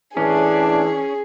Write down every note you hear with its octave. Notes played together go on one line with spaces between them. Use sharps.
A2 E3 C#4 D4 G#4